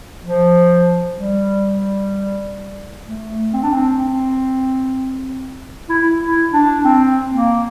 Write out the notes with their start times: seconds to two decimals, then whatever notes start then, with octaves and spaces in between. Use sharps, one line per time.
0.22 F3
1.16 G3
3.05 A3
3.53 C4
3.63 D4
3.72 C4
5.89 E4
6.21 E4
6.52 D4
6.84 C4
7.30 A#3